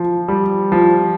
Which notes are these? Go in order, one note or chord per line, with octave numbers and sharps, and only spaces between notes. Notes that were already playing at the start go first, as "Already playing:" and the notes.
Already playing: F3
G3
F3